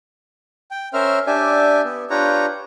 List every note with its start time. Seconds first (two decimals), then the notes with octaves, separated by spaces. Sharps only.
0.71 G5
0.94 C#4 A#4 C5 E5 F6
1.27 D4 G4 D5 E5 G#5
1.85 B3
2.10 D4 F4 G4 B4 C#5 A#5